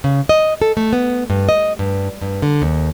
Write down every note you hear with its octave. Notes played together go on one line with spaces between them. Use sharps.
C#3
D#5
A4
A3
B3
G2
D#5
G2
G2
D3
D#2